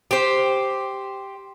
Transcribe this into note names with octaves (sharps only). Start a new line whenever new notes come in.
G4 C5